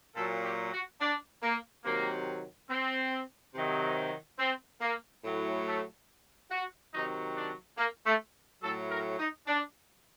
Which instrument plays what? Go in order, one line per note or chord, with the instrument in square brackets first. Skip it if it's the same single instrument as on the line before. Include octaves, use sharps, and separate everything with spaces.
[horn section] A#2 F#3 A4
G4
F#4
D4
A#3
C3 D#3 F#3 A#3
C4
C3 D#3 F#3
C4
A#3
A2 F#3
A3
F#4
C3 D#3 F#3 D#4
D4
A#3
A3
A2 F#3 A4
A#4
D#4
D4